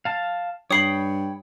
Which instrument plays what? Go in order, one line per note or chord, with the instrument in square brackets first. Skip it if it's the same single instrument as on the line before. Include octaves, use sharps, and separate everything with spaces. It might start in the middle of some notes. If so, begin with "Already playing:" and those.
[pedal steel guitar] F5 A5
[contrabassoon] G2 [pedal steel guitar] C#5 G5 B5 [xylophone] D#6 C7 F#7